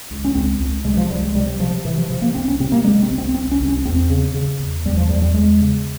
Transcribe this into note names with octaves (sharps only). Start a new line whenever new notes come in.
C#2
C#4
C#2 C4
C#2
C3 G#3
F3
C#2 G3
G#3
C3 G3
C3 F3
C3 E3
F3
C3 F3
A#3
C2 C4
C#4
C3 C4
A#3
C3 G#3
C4
C2
C4
C2 C4
C#4
C2
C#4
E2 C4
C#3
C#3
E2
E2 G3
F3
E2 G3
G3
E2 G#3
C#3